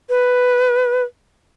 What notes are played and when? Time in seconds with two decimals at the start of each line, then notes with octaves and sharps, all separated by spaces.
0.09 B4